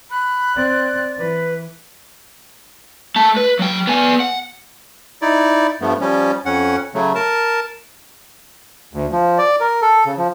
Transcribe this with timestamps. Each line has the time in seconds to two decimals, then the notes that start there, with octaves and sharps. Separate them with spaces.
0.11 B5 F#6
0.56 C4 D5
1.18 E3 B4
3.16 A3 A5
3.37 B4
3.59 F#3 G5
3.87 B3 G#5
4.20 F#5
5.22 D#4 E4 D5
5.81 G2 F3 A3 B3
6.01 F3 G3 C#4
6.46 F2 C#4 F#5
6.94 C#3 F#3 A3
7.15 A#4 A5
8.94 D2
9.12 F3
9.38 D5
9.60 A#4
9.82 A4
10.06 C#3
10.18 F3